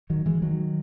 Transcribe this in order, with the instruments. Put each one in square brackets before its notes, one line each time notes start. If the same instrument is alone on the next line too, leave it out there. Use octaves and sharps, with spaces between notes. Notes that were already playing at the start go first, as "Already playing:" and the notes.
[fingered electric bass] D#3 F#3
E3 G#3
D#3 F#3